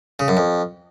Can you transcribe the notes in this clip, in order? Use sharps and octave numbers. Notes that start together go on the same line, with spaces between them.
C#3
F#2
F2